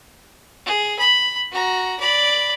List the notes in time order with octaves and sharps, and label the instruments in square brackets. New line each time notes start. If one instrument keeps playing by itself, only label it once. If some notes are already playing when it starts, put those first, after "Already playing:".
[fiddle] G#4
B5
F#4 A#5
D5 B5